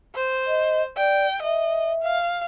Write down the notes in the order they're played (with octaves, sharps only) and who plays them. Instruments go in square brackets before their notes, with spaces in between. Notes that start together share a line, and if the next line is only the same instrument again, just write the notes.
[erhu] C5
[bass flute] D#5
[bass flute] D5 [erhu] G5
[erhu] D#5 [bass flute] E5
[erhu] F5